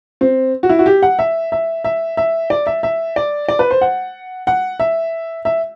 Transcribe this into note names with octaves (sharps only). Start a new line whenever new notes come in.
C4
F#4
E4
F#4
G4
F#5
E5
E5
E5
E5
D5
E5
E5
D5
D5
B4
C5
F#5
F#5
E5
E5